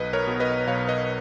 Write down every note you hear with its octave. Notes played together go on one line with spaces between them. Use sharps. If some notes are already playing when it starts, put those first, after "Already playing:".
Already playing: B1 B4 D#5
A#4 C#5
B2
B4 D#5
B1 C#5 F5
B4 D#5